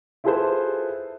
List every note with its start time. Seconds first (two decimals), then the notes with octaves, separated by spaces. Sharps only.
0.24 E4 F4 G#4 A4 B4 C5